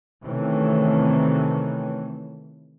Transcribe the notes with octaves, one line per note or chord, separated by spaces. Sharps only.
C3 D#3 E3 A3 C4 C#4